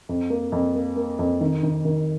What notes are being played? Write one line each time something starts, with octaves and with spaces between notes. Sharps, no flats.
F2
A#3
F2
A#3
A#3
F2
D#3
D#3
D#3